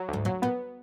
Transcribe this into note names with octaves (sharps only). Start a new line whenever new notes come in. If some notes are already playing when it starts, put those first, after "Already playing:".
Already playing: F#3
D2 G#2
A#2 F#3
A#2 B3